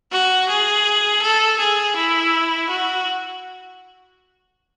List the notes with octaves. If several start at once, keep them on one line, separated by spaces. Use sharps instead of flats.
F#4
G#4
A4
G#4
E4
F#4